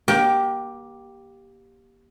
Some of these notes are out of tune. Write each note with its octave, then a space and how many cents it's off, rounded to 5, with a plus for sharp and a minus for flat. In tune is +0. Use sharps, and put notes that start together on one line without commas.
A#3 +30 G4 +0